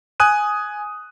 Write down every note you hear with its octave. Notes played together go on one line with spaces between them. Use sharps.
G#5 D#6 F#6 D#7